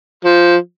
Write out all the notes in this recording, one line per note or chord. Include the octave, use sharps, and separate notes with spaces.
F3